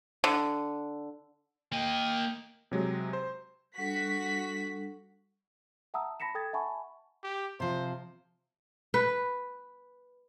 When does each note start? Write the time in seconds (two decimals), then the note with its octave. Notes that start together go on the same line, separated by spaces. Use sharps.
0.24 D3
1.73 A#3 D#5 G5
2.71 C3 F#3 G#3
3.13 C5
3.78 G3 D4 F#4 A4 B6
5.94 E5 F#5 A5 A#5 D#6 E6
6.20 A5 B5 A#6 B6 C#7 E7
6.35 A4 G5 D#6 G#6 A6
6.53 E5 F#5 G#5 A5 B5 C#6
7.24 G4
7.60 C3 F3 C5
8.94 B4